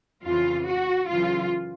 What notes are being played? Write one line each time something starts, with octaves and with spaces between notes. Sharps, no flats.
F2 C#3 E3 F4
F#4
F#2 C#3 E3 F4